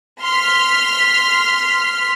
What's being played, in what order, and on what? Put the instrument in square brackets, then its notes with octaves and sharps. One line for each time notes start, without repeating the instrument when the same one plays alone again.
[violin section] C6 F6 B6